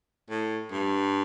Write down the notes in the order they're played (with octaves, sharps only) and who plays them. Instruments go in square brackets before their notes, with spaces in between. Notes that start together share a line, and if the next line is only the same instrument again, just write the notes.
[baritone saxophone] A2
G2